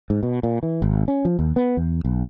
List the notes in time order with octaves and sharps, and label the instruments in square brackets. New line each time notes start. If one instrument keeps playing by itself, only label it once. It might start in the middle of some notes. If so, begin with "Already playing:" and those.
[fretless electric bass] G#2
B2
A#2
E3
G#1
C#4
F3
D#2
B3
E2
B1